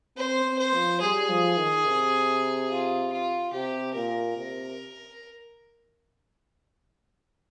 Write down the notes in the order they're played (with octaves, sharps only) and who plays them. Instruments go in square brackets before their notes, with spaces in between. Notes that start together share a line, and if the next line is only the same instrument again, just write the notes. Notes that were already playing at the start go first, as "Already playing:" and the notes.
[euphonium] C4 [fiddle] C5
[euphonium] C4
[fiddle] C5
[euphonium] F3
[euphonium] G3 [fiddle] G#4
[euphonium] F3
D#3
C3
[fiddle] F4
F4
[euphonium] C3 [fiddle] G4
[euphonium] A#2 [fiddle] A#4
[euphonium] C3